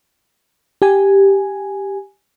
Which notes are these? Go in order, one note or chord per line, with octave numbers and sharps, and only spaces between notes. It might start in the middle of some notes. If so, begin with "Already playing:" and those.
G4 G#5